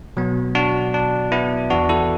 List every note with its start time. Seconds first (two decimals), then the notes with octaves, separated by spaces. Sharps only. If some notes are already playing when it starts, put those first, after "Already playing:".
0.17 B2 F#3 B3
0.55 D4 F#4
0.94 D4
1.32 B3 E4
1.70 E2 E3 B3 D4 F#4
1.89 E4 A4